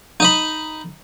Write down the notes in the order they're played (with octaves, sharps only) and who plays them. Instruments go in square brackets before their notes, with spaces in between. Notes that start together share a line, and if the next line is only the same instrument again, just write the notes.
[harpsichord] D#4 D#5 B5